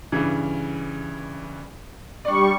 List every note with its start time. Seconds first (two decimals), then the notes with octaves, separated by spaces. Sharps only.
0.12 G2 C#3 E3
2.25 G3 D4 D5 C#6